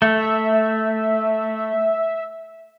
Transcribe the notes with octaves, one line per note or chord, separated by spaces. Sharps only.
A3 E5